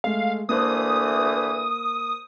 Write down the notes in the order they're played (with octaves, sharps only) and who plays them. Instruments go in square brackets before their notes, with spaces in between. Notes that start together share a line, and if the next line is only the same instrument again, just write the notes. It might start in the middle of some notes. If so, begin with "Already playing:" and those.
[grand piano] G#3 A3 [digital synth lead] F5
[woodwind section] D2 D3 E3 [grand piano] A#3 C5 F#6 [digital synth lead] D#6